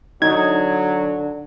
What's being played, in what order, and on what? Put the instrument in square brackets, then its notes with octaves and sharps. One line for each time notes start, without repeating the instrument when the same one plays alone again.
[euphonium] D3 [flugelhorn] F#3 [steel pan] D#4 [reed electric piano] G#6